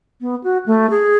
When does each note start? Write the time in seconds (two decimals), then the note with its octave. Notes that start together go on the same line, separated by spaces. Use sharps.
0.21 B3
0.44 F#4
0.66 A3
0.90 G#4